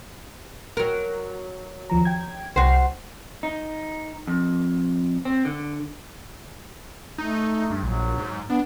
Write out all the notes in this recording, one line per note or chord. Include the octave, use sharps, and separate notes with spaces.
F#3 A#4
D#2 F3 A#5
G5 G#6
C2 F#4 C5 G5 C7
D#4
F2
C4
D3
A3 D#4
G2
A#1 F#3
G#2
B3 D4